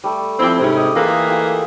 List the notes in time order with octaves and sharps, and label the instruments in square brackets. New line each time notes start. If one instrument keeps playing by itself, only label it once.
[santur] G3 A3
[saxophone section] F3 C4 [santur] E4 G4
[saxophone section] G#2 C3 C#4
[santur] D#5
[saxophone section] E3 A#3 G#4 [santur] F4 A4
[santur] F4 G4